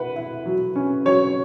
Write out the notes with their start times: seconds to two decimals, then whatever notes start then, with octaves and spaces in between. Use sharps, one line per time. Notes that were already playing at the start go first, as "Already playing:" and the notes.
Already playing: E4 B4 F#5
0.16 E4
0.46 F#3
0.76 C#4
1.05 F#3 C#5